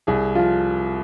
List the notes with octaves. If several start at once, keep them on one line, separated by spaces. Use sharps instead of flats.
C2 G#4
F3 F4